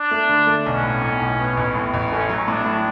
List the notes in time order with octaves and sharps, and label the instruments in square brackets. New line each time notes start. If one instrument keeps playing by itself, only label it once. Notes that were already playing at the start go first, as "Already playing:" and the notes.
Already playing: [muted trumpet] D4
[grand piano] A3
D3
A3
[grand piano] B1 [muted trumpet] C#4
[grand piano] A2
A2
B1
B3
A1
A2
A1
[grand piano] A3 [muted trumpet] C#4
[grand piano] F#3
[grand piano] A2 [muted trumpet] D4
[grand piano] A2